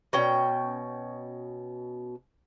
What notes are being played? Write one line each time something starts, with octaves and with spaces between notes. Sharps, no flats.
B2 C#4 G5